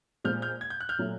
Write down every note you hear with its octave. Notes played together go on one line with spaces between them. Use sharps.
A#2 F3 G#3 F6 G6
F6 G6
G#6
G6
F#6
F6 G6
A#2 F#3 A3